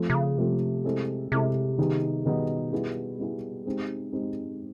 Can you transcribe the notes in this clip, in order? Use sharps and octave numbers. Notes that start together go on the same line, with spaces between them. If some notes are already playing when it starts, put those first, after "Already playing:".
Already playing: F3 A3 C4 F4 A4
C3
C#3
C3 F3 A3 C4 F4 A4
G#3 C4 E4 A4
C3 G#3 C4 E4 A4
D#3 G3 B3 D#4 G#4
B2 D#3 G3 B3 D#4 G#4
G3 B3 E4 G#4
G3 B3 E4 G#4
C3 G#3 C4 D#4 G4
G#3 C4 D#4 G4
D3